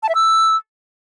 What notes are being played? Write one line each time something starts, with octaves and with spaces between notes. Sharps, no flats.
A5
E5
E6